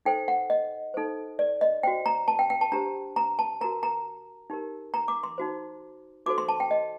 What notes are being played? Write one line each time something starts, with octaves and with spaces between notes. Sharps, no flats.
D#4 A4 C5 G5
F#5
D#5
D#4 A4 C5
D5
D#5
F#4 C5 G5
A#5
A5
G5
G5
A5
D4 G4 C5 A#5
A#5
A5
F#4 A#4 A#5
A#5
D#4 G4 A#4
A#5
D6
C6
D#4 F#4 C5
D#4 F#4 A4 C5 D6
C6
A5
G5
D#5